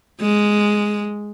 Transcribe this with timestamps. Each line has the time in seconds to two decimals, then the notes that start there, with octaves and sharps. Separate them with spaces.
0.21 G#3